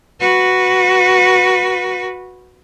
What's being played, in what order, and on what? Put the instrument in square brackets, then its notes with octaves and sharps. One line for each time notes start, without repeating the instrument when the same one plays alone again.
[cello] F#4 B4